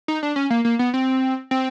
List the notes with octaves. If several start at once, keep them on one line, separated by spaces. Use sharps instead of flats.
D#4
D4
C#4
A#3
A#3
B3
C4
C4